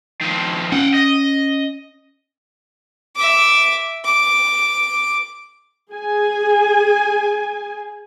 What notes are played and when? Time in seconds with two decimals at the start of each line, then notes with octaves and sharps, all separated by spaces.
0.21 D#3 F3
0.72 C#4 F#5 G5
0.94 D#5
3.16 E5 D6
4.05 D6
5.90 G#4 G#5